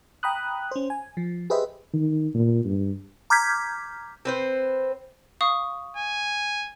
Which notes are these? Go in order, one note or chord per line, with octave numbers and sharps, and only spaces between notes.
G5 A#5 B5 D#6 F#6
C#4 C5
G#5
F3
G4 G#4 B4 C5 D#5 E5
D#3
A#2
G2
A#5 D6 F6 G6 G#6 B6
C4 B4 C5
F5 C#6 D#6
G#5